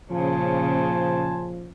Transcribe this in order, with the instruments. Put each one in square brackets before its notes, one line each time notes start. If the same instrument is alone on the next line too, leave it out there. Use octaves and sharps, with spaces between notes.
[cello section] A#2 C#3 [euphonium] F3 [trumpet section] C5 G#5 A5